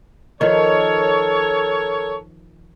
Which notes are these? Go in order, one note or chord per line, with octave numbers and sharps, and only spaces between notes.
D#3 F3 A4 A#4 C#5